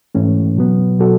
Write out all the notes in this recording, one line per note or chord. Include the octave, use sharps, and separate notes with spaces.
G#2 E3 A3 C#4
B2 F#3 B3
B2 F#3 B3 F#4 A4